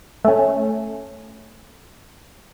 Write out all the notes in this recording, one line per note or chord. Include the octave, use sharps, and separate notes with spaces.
A3 C#4